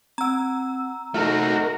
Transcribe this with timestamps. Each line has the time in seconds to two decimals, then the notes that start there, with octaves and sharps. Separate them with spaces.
0.18 C4 F#5 A#5 E6
1.14 A3 D#4 F#4 A#4 E5 F6